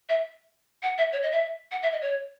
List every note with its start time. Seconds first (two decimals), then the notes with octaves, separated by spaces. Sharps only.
0.09 E5
0.83 F#5
0.98 E5
1.12 C#5
1.23 D#5
1.32 E5
1.72 F#5
1.82 E5
1.93 D#5
2.02 C#5